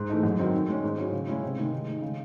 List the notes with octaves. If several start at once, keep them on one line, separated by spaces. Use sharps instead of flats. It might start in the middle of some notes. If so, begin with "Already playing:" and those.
Already playing: G#2
E3 A3 D#4
F#2
D#3 F#3 C4 D#4
D#3
G#3 C#4
G#2
F#3 C#4 E4
C#3
G#3 C#4 E4
C3
D#3 G#3 D#4
D#3
G#3 D#4
C#3